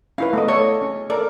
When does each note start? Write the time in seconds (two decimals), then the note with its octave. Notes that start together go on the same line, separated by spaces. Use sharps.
0.18 C#4 E4 B4 F5
0.33 A3 B3 D#5
0.48 A4 C#5 D5
0.82 C#4
1.10 A4 A#4 D5